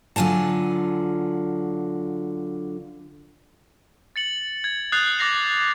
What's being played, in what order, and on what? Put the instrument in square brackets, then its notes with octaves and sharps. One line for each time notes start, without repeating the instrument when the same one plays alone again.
[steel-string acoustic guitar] D3 F#3 F4 G#5 A5
[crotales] A6 C#7 F#7
G#6
D#6 F#6 G6 A6 C7 F7
D6 F#6 A6 A#6 C7 F7